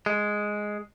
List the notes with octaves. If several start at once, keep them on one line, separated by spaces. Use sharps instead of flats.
G#3